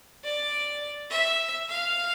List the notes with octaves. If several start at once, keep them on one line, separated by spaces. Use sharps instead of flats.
D5
E5
F5